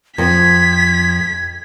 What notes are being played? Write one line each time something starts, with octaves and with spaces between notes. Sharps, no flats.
F2 G#6 B6